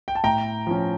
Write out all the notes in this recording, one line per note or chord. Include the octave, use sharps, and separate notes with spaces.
G5
A5
A2 G5 A#5
F3 C#4